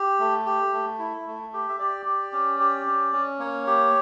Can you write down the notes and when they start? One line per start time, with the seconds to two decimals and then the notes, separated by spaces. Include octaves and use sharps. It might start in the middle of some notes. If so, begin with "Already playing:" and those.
Already playing: G4
0.19 A3
0.46 G4
0.73 A3
0.99 E4
1.27 A3
1.53 G4
1.69 E5
1.79 G4 D5
2.06 G4
2.32 C#4
2.60 G4
2.87 C#4
3.13 C#4
3.39 A#3 C#5
3.67 G4